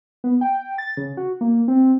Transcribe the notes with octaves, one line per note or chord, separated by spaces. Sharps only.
B3
G5
A6
C#3
F#4
A#3
C4